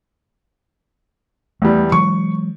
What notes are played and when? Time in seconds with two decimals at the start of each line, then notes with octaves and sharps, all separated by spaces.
1.62 E2 G3 A3
1.92 E3 F#3 G#3 C#6